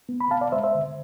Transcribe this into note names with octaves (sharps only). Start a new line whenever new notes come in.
B3
B5
B3 F5 A5
D5 F5
G#3 C5 E5
C5 E5
D3